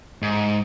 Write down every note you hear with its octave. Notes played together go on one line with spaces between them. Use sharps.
G#2